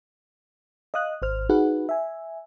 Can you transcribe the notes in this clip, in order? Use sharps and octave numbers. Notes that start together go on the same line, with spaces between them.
D#5 F5 D#6 F#6
G#1 C5 F6
D#4 F#4 G#4 B4 F#5
E5 G#5